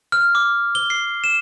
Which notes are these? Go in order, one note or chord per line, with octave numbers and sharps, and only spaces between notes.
F6
D6
G7
C7
E7